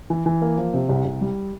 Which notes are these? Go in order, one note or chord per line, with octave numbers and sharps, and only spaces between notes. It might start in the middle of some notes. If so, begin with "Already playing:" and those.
E3
E3
A#3
F3
C3
C2
C2
G3